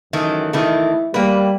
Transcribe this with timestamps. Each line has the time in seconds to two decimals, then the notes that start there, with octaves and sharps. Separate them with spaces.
0.13 F#2 D#3 E3 A3
0.53 D#3 E3 A3 E4
1.14 G3 A#3 B4